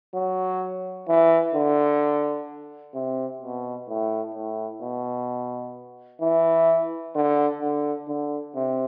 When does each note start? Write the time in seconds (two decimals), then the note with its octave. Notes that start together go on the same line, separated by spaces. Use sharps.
0.15 F#3
1.08 E3
1.55 D3
2.94 C3
3.42 B2
3.89 A2
4.35 A2
4.82 B2
6.22 E3
7.15 D3
7.62 D3
8.08 D3
8.55 C3